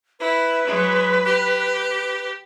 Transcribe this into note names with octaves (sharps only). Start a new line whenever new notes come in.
E4 B4
F#3 G#3
G4